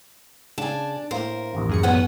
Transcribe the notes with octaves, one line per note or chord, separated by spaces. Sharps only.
C#3 D4 G#5 A5
A2 A#3 A#4 C5
A1 D#2
F#2 G#4 C#7
B3 C#4 B4 F#5 G#5